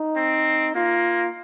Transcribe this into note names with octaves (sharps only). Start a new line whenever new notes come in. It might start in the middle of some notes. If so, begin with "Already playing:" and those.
Already playing: D#4
C4
A#3 F4